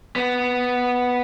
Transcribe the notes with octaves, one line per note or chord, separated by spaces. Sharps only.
B3